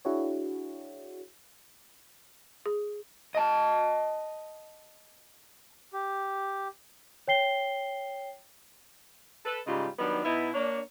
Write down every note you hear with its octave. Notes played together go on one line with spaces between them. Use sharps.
D4 E4 F#4 G#4 C#5
G#4
D#5 A5
G4
C#5 G5 C7 G7
A4 B4
G#2 C#3 G3 G#3 F4 G4
D#3 F#3 G3 B3 D4 D#4
B2 B3 D#4 E4
A#3 D4 C#5